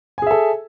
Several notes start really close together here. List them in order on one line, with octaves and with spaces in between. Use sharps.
G#5 G#4 E5 A4